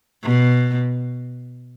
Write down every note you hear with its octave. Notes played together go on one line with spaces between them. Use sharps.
B2